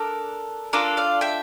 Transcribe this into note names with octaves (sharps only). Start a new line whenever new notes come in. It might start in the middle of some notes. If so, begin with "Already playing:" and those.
Already playing: D4 A4 A#4
D4 F4 A4 A#4 D5
D5 F5
E5 G5